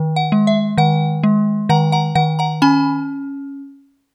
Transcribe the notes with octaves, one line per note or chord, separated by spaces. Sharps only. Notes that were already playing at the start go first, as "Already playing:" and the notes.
Already playing: D#3
F#5
G#3
E5
D#3 F#5
G#3
D#3 F#5 A#5
F#5 A#5
D#3 F#5
F#5 A#5
C#4 G#5 B5